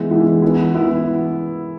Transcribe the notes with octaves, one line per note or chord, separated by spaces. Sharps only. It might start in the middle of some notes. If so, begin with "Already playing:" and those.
Already playing: E3 G#3 B3 E4
E3 G#3 B3 E4
E3 B3 E4
E3 B3 E4